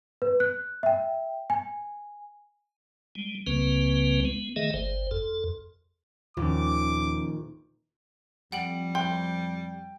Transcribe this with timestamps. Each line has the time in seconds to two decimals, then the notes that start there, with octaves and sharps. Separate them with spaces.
0.22 B4
0.40 F#6
0.83 E5 G5
1.50 G#5
3.15 G3 G#3
3.47 C#2 C#3 G3 A#3 C4 B4
4.25 G#3 B3
4.56 D#3 A3 G#4 D#5 E5
4.74 G1 C5
5.11 F2 A4
6.37 D#1 D#2 F3 C#4 D6
8.52 F2 G3 F#5 G5 F#7
8.95 G5 C6